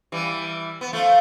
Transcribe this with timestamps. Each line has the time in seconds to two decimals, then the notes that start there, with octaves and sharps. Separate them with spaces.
0.12 E3 G3
0.81 B3
0.93 F3 A3